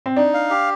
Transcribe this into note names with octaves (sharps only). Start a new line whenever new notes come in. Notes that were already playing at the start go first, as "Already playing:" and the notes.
C4
D4 D#4
F5
G4